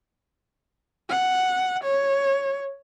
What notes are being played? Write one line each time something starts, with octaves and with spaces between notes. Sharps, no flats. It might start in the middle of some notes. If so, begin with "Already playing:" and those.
F#5
C#5